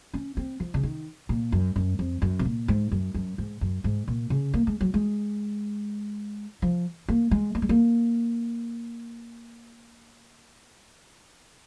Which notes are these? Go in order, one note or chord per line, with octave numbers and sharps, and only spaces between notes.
C#4
C4
F3
C#3
D#3
A#2
F#2
F#2
F2
F#2
C3
A#2
G#2
F#2
F#2
G#2
F#2
G#2
A#2
C#3
A#3
G#3
F#3
G#3
F3
A#3
G#3
A#3
G#3
A#3